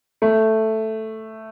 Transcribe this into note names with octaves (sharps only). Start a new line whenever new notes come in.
A3